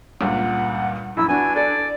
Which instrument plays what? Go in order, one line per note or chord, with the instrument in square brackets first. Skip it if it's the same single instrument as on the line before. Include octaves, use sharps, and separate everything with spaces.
[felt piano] C#2 G2 A#2 [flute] F#5
[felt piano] A#1 F#2 [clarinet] E4 [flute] E6
[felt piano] B3 F#4 [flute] D4 [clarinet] G#5
[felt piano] A4 [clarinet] D5